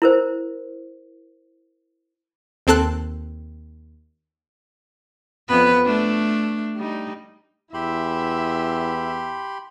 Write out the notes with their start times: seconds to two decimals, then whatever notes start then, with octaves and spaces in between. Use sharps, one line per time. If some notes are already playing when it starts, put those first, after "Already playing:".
0.02 E4 A#4 C5
2.67 D#2 C4 A4 A5 F#6
5.49 F2 B3 B4
5.85 A3 D4
6.76 G3 D#4
7.74 E2 E4 G4 E5 B5 C6